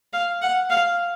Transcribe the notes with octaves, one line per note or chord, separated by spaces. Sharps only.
F5
F#5
F5